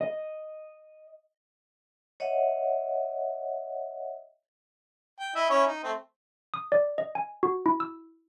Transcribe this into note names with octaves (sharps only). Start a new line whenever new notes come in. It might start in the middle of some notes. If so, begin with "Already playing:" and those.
D#5
C#5 D#5 E5 F#5
G5
E4 D#5 E5
C#4 E4 C#5
D#4
A3 C4
D#6
D5
D#5
G#5
F#4
E4
E6